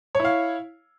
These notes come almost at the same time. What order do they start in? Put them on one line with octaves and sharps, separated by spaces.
C#5 E4 F5